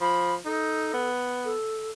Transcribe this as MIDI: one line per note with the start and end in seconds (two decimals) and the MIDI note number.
0.01 0.37 53
0.01 0.35 83
0.46 0.94 63
0.46 1.09 69
0.94 1.54 59
1.45 1.91 69